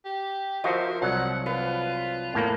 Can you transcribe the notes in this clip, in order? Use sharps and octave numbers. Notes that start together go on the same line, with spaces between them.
G4
F3 F#4 A#4 C5 D#5 E5
C2 F#3 F#5
F4 B4
E2 A2 A#3